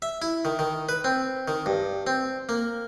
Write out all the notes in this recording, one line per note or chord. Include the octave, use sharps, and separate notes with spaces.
E5
E4
D#3
D#3
B4
C4
D#3
G2
C4
A#3